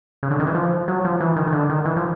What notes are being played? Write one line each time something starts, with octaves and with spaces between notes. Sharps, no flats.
C#3
D3
D#3
E3
F3
F#3
F3
E3
D#3
D#3
D3
D#3
E3
F3